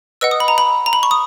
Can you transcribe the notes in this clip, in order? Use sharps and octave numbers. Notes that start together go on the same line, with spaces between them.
B4 D#5 F#5 E6
D#6
B5
A#5
B5
A#5
B5
C#6
D#6